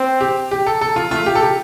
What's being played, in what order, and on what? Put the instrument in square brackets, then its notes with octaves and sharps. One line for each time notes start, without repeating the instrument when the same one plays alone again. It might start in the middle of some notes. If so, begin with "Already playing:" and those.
Already playing: [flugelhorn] C4
[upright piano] G4
G4
A4
A4
F4
[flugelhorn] A3 [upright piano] F4
[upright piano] G4
A4
G4